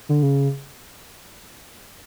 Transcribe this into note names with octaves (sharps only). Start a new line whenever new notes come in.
D3
C#3